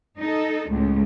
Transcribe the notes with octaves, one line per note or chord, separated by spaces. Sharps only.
D#4 A4
C#2 A2